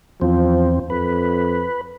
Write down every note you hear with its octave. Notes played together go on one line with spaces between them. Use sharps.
E2 F3 C4
F2 B4